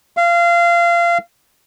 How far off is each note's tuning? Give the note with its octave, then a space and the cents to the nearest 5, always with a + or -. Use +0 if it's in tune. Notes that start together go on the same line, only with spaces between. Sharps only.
F5 -25